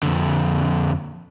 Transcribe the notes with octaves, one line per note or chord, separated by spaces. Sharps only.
F2 D3